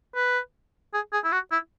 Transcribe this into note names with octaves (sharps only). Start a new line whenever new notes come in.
B4
G#4
G#4
E4
F#4
E4